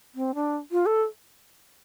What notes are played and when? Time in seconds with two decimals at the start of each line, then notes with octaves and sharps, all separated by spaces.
0.15 C4
0.35 D4
0.72 F4
0.86 A4